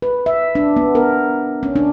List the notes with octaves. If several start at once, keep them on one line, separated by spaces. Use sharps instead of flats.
B4
E5
D4
B3
A#4
C#4
D4